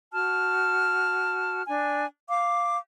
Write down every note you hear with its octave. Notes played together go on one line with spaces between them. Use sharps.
F#4 A5 F6
D4 G#5
F5 D6